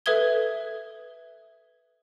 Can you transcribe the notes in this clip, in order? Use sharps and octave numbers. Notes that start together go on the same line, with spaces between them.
A4 B4 E5 D#6 G#6 G7